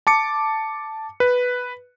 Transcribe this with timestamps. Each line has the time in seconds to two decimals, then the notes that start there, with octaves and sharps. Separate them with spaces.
0.07 A5 D6 C#7
1.20 B4